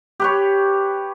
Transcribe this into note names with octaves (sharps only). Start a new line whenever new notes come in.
G4 B4 C#5